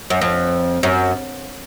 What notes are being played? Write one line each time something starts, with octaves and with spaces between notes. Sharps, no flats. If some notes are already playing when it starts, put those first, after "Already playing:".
F#2
F2
F#2